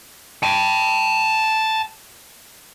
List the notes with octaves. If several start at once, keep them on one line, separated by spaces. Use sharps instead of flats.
G5 A5